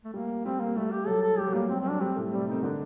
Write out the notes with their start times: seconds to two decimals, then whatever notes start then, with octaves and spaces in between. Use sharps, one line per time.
0.05 A3
0.14 G3 A#3
0.44 G3 C4
0.60 A#3
0.76 G3 A3
0.92 G4
1.07 F#3 A4
1.23 A4
1.38 G3 G4
1.47 F#3
1.54 G3 A#3
1.69 G3 C4
1.80 C4
1.86 F#3 D4
2.01 G3 C4
2.16 A2 A3
2.32 C3 G3 C4
2.47 C4 D#4
2.63 D3 D4 D#4